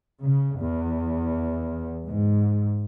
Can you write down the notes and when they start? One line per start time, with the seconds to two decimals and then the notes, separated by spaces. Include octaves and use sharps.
0.19 C#3
0.60 E2
2.05 G#2